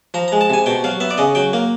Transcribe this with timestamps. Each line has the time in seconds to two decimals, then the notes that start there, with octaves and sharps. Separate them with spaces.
0.14 F3 A#5
0.28 A#5
0.32 G#3
0.41 A5
0.50 C3 G#5
0.66 B2 G5
0.84 F#3 F5
1.00 B3 E5
1.10 D5
1.18 C#3 D#5
1.35 F#3 G5
1.53 A#3